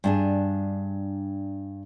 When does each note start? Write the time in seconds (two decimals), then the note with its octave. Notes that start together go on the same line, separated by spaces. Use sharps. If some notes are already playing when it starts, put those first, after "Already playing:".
0.04 G2 D4 G#4